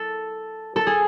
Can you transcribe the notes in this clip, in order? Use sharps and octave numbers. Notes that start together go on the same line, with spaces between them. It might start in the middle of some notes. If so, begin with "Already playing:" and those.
Already playing: A4
A4
G#4